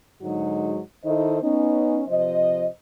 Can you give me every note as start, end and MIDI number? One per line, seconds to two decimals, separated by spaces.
0.22 0.78 44
0.22 0.78 50
0.22 0.78 54
0.22 0.78 56
0.22 0.78 63
0.22 0.78 66
1.04 1.37 51
1.04 1.37 63
1.04 1.37 64
1.04 1.37 69
1.04 1.37 72
1.04 1.37 75
1.42 2.01 59
1.42 2.01 61
1.42 2.01 63
2.08 2.67 48
2.08 2.67 53
2.08 2.67 72
2.08 2.67 75